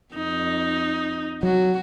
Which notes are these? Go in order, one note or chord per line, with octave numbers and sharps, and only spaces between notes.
F2 D#4
F#3 F#4